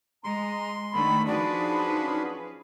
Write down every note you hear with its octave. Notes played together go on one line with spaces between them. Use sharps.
G#3 A#5 C6
D3 D#3 A3 B5
F3 D4 D#4 F#4 G#4 B4 D5
C#4